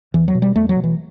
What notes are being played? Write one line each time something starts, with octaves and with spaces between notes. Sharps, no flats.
E2 E3
F#3
B2
G3
E2 A3
F#3
B2
E3